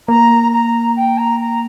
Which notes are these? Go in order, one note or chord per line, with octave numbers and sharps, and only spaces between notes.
A#3 A#5
A#5
G5
A#5
A#5